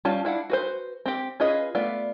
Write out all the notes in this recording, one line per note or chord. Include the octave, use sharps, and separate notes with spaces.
G3 C#4 F4 A5
D4 E4 F5 F#5
F#4 B4 C5
C4 G4
C#4 F4 G#4 B4 D#5
A3 B3 F4 D5